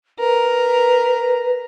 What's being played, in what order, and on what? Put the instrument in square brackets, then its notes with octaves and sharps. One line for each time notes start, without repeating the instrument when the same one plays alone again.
[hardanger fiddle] A#4 [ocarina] B4